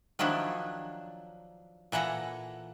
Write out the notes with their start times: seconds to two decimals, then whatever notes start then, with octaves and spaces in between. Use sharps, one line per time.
0.19 D#3 F3 F#3 D4 E4
1.92 A#2 E3 A4 F#5 A#5